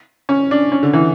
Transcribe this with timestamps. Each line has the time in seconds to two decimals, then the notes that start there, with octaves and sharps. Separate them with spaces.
0.29 C#4
0.51 D4
0.72 C#4
0.83 D3
0.93 E3